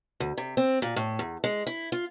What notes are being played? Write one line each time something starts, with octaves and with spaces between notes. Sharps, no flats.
D2
C3
C4
A#2
A2
E2
G#3
E4
F4